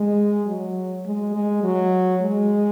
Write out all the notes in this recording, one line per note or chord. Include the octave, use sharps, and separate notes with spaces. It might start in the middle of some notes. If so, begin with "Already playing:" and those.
Already playing: G#3
F#3
G#3
G#3
F#3
G#3